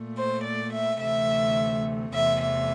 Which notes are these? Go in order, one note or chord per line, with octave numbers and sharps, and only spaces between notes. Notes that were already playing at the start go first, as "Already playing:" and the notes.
Already playing: A#2 A3
C5
D5
E5
D2 C3 E3 A3 E5
E2 C3 E3 A3 E5
E5